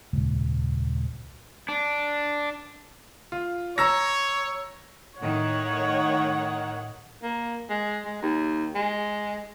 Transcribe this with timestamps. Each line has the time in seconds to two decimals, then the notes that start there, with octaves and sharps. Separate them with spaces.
0.13 D#1 C#2 G#2
1.68 D4
3.32 F4
3.78 C#5 A#5 E6 A#6
5.19 A2 D#3 C#5 F#5
7.23 A#3
7.70 G#3
8.06 G#3
8.22 D#2
8.75 G#3